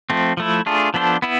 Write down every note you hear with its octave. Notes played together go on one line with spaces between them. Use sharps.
F3 A3 C4
F3 A3 E4
A3 D4 F4 G#4
F3 B3 D4 A4 C5
B3 E4